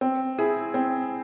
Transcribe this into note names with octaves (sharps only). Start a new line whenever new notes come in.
C4
E4 G#4
C4